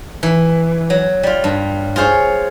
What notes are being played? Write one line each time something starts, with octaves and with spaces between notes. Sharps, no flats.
E3
F#3
G3 F4
G2
F4 G#4 C5 C#5